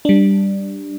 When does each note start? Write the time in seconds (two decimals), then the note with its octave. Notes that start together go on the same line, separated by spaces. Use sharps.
0.05 G3 D4